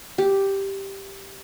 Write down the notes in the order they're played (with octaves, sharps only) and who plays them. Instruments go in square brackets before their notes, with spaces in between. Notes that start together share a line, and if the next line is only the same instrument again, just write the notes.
[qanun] G4